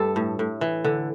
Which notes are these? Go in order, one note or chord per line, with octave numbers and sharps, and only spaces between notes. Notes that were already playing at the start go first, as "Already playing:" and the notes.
Already playing: G2 A3 A4
A2
A2
E3
D3